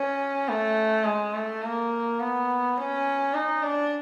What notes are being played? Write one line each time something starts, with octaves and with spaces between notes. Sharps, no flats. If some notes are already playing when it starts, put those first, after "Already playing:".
Already playing: C#4
A3
G#3
A3
A#3
B3
C#4
D#4
D4